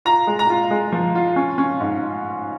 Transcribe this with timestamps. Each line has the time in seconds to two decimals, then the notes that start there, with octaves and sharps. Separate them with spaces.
0.05 F4 A#5
0.27 G#3
0.39 A#5
0.50 F4
0.71 G#3
0.92 F3
1.15 F4
1.36 C#4
1.58 C#4
1.80 G#2